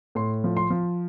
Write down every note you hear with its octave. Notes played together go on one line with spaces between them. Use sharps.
A2 C6
F3
C6
F3